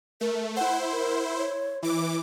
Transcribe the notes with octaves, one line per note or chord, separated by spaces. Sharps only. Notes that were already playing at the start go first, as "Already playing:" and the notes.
A3 A#4
E4 C5 F#5
A#4
C#5
E3 E4 D6